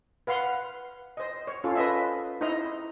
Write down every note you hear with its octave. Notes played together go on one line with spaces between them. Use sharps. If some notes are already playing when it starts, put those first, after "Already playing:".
B4 F5 F#5 C6
C5 D#5
C#5
C#4 F4 A4
B4 C5 D#5 E5
D#4 E4 C5 D#5 A#5